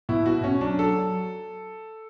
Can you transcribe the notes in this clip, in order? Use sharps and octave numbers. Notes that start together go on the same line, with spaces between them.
B2 E4
B2 F#4
B2 C#4
F#3 D4
F#3 A4
F#3